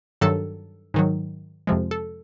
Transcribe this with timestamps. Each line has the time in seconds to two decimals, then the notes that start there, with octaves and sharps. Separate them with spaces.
0.21 G2 D#3 F#3 A4
0.94 G#2 D#3 F#3
1.67 F2 C3 F3 G#3
1.91 A4